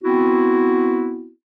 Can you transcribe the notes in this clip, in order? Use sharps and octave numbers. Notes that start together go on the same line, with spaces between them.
B3 C4 E4 F#4